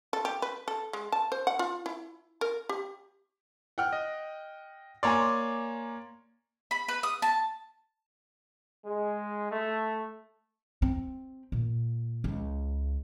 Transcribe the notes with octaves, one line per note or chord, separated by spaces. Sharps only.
A4
G4
B4
A4
G#3
A5
C5
F#5
F4
E4
A#4
G4
F#5 G5 F6
D#5
A#3 C#5 D5 G#5 A#5 C6
B5
B4
D#6
A5
G#3
A3
C4
A#2
C#2